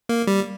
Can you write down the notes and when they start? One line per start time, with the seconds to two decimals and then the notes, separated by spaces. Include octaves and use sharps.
0.09 A#3
0.27 G3